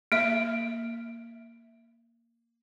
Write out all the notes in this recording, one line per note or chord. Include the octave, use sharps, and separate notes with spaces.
A#3 E5